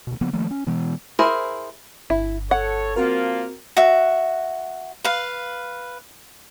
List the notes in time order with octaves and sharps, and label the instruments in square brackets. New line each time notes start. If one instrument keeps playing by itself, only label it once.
[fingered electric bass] D2 B2
C#3 F3 A#3 B3
D#3 F3 A3 A#3
C#4
B2 E3 G#3 B3
[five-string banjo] E4 G#4 A#4 C5
[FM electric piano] G1 [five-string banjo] E4
[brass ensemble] A4 C#5 [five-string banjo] F#5
[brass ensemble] F3 A#3 F4 [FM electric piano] C4 F#4 A#4
[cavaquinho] F#4 E5
B4 F5